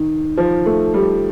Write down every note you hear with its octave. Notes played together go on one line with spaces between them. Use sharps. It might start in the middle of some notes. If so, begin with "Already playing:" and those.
Already playing: D#3
F3
A3
G3